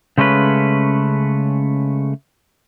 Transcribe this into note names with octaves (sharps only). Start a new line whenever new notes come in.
C#3 G#3 A3 C#4 B4